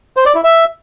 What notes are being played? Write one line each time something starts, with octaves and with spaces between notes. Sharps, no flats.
C5
D5
E4
E5